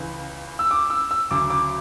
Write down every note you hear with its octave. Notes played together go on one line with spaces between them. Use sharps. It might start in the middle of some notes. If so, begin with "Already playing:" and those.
Already playing: C#2 C#3 E3
E6
D6
E6
E6
D2 C#3 F#3 D6
D6